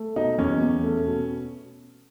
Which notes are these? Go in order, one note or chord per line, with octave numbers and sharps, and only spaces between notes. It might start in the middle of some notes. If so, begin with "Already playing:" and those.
Already playing: A3
B2 D#4
E2 C#4
E2
A3
B2